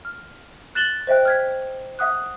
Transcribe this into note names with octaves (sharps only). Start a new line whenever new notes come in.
F6
F#6 A6 E7 F#7 G7
C5 D#5 E5 G5 F#6
F6 G#6 B6
E5 F#5 D#6 F#6